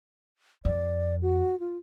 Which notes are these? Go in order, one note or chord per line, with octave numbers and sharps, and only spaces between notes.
F2 D5
F#4
F4